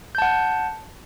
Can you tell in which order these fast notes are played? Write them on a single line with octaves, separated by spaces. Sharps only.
G6 A5 F#5